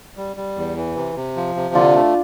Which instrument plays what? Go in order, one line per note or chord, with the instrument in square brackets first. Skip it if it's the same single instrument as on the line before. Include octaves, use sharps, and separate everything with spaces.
[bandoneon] G3
G3
E2
E3
C3
C3
F3
C3
[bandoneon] D3 [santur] D4 F4
[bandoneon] A3